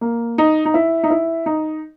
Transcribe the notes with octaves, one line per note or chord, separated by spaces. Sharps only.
A#3
D#4
D#4
E4
D#4
E4
D#4